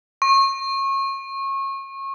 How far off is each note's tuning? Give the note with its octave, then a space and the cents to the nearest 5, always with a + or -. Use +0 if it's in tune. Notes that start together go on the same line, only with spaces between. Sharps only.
C#6 -30